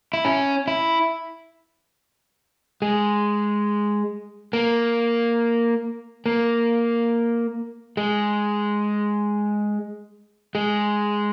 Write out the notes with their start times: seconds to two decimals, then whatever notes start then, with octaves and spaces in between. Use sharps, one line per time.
0.13 E4
0.25 C#4
0.68 E4
2.82 G#3
4.53 A#3
6.26 A#3
7.97 G#3
10.55 G#3